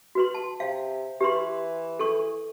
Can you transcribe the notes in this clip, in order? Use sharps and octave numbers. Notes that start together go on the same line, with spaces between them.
F#4 B4 C6
A5
C3 F5
E3 G4 B4 C6
A4 C#6